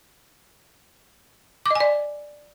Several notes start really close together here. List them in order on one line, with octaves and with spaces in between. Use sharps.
D6 D#5 G#5 D5